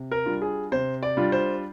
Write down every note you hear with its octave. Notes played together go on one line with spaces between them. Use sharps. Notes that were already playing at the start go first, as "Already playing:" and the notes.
Already playing: C3
A#4
G3 D4 F4
G#4
C3 C5
D5
G3 D4 F4
C5